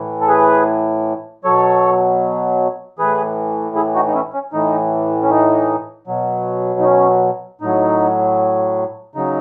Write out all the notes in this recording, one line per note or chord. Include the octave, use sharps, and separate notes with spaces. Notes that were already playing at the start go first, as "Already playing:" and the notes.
Already playing: A2 E3
A4
G#4 B4
B2 F#3 A4 C#5
A2 E3 G#4 B4
E4 G#4
D#4 F#4
D#4
C#4 E4
C#4
A2 E3 D#4
C#4
D#4
B2 F#3
D#4
C#4
A2 F#3 D#4
C#3 F#3 D#4